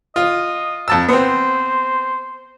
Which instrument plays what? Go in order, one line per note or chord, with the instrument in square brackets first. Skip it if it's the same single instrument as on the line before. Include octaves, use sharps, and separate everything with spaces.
[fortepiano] F4 [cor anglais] D#5
[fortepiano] F2 A5 E6
[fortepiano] B3 C4 [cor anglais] C5